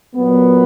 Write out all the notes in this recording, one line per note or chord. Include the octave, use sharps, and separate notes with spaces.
A#2 F#3 B3